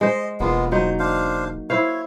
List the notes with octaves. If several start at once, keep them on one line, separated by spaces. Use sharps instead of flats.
G#3 C5 D#5
E1 G#3 A#3 B3 F4
F#3 D#4 C5
D4 C5 F5
E4 C5 C#5 F5